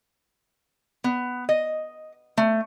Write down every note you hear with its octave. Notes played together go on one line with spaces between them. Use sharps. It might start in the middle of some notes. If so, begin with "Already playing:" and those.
B3
D#5
A3